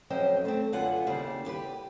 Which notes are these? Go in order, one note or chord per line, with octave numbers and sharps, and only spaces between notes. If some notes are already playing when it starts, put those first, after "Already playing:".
F2 F#3 C#4 C5 D#5 G5
A3 C4
F#2 D3 B3 F4 F#5 G#5
D#2 C#3 G3 E4 C5
E4 G4 B4